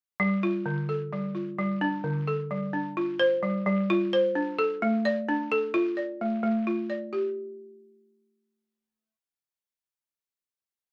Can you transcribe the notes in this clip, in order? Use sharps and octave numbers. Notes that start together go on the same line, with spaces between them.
G3
F4
D3
A4
G3
F4
G3
D4
D3
A4
G3
D4
F4
C5
G3
G3
F4
C5
D4
A4
A3
D5
D4
A4
F4
D5
A3
A3
F4
D5
G4